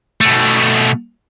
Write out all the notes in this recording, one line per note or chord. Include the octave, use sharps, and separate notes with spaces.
B2 A3